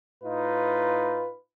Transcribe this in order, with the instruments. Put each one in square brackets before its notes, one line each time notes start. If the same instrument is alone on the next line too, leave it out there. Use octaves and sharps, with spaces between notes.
[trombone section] A2 D#4 F4 B4